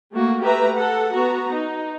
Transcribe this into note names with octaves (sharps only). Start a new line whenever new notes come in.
A3 A#3 F#4
A3 G4 B4 E5 A#5
A4 F#5
B3 F#4 A#5
D#4